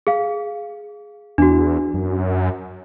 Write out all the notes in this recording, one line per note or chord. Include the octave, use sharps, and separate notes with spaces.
G#4 F5
E2 D4 F#4
F#2